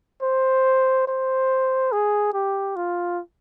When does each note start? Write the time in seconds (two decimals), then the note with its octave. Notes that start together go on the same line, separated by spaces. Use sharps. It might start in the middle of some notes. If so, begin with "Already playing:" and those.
0.22 C5
1.07 C5
1.92 G#4
2.34 G4
2.76 F4